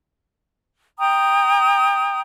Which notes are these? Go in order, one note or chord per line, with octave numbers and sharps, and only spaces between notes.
G5 A#5 D#6